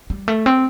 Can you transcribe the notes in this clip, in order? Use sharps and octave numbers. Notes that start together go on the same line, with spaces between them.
G3
A3
C4